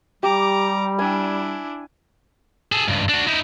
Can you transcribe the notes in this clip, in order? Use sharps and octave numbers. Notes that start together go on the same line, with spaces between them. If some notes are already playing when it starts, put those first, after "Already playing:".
G3 G4 A#5 D6
D4 E4 G#5
G#4 A4
C#2 G2
D4 F#4
D#4 E4